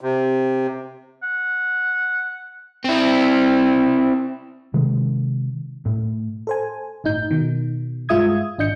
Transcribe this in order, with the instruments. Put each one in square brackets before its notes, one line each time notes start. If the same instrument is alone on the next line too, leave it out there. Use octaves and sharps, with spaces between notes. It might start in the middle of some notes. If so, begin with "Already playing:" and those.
[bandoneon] C3
[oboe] F#5
[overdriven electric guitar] C4 E4
[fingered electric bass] C3 D#3 G#3
A2
[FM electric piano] A4 C5 G#5
G1 A2 D#4 G6
B2 D#3
G2 G#3 F4 E5 D#6 G#6
G#1 D4 D#5 G6 C#7